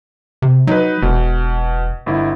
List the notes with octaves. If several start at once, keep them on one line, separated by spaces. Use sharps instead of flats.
C3
F#3 D#4 B4
E1 B2
G1 E4